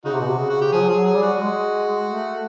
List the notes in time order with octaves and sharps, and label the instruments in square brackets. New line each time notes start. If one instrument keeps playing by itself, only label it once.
[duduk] C#3 [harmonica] D#4 F#4
[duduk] C3
B2
C3
C#3
[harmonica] F#4
G4
[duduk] F3 [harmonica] G#4
[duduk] F#3
[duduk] F3 [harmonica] G#4
[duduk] F#3
[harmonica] G#4
[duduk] G3
[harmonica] F#4
[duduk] G3
G#3
A3